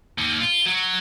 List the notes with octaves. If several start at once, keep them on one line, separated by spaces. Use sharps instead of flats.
D#2
F4
F#3